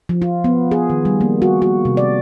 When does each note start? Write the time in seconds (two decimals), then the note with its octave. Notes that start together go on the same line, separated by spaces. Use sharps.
0.09 F3
0.22 F4
0.44 B3
0.71 G#4
0.90 D#3
1.05 G3
1.21 A#3
1.42 F#4
1.62 F#4
1.85 C3
1.97 D5